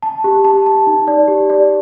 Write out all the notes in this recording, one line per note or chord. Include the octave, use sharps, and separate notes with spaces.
A5
G4
A5
A5
D#4
D5
G4
D5